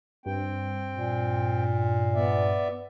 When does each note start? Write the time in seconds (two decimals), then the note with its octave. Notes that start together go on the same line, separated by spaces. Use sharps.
0.26 G2 C4 G5
0.96 A#2
2.14 B3 D5 E5